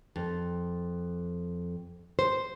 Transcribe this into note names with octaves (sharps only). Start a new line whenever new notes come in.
F2
C5